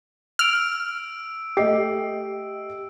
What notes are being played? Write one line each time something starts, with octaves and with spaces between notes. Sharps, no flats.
E6 F6 D7
A3 G4 D#5 C7